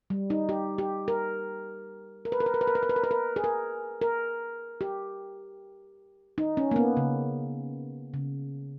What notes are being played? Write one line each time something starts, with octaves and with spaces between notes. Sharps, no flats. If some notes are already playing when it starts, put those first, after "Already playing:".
G3
D#4
G4
G4
A#4
A#4
B4
A#4
B4
A#4
B4
A#4
B4
A#4
B4
A#4
B4
A#4
G#4
A#4
A#4
G4
D#4
C#4
A#3
B3
C#3
C#3